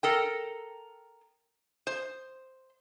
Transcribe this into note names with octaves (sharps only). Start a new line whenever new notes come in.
A4 A#4 G5
C5